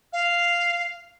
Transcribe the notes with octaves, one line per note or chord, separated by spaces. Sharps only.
F5